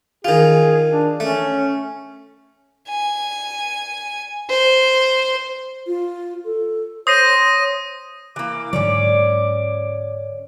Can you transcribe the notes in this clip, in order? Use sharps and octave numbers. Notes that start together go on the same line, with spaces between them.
D#3 F4 G#4
D4
A3 C#4
G#5
C5
F4
A4
C5 C#5 D#6 A#6 D#7
E3 A#3 D6
G#2 D3 F#3 C#4 C#5 D5